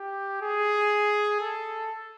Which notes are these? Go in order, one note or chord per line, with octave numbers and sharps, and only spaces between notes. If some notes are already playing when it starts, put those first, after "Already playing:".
Already playing: G4
G#4
A4